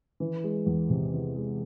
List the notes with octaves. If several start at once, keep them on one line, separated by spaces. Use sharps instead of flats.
E3
G#3
E2
C3
E3
G#3